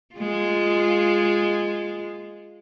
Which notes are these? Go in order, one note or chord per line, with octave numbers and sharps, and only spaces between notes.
G#3 F4